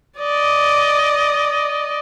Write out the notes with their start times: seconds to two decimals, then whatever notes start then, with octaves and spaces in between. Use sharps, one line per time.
0.19 D5 D#5